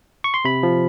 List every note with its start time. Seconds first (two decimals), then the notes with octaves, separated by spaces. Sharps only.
0.24 C#6
0.34 C6
0.45 C3 B5
0.63 F3